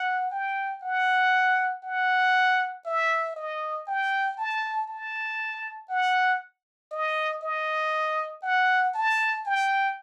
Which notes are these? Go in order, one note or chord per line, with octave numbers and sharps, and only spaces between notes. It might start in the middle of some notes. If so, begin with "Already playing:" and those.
Already playing: F#5
G5
F#5
F#5
E5
D#5
G5
A5
A5
F#5
D#5
D#5
F#5
A5
G5